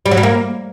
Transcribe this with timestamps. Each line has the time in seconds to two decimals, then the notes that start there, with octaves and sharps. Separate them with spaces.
0.06 G3
0.11 F#3
0.17 G3
0.23 A#3